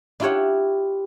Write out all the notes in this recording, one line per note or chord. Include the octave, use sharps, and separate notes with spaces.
D4 E4 F4 G4 C#5 F#5